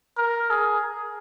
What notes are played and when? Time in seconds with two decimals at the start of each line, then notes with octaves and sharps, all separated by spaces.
0.17 A#4
0.50 G#4